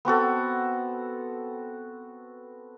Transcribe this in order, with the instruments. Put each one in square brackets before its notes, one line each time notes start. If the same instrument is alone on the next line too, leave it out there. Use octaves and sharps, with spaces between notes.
[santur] B3 C4 F#4 A4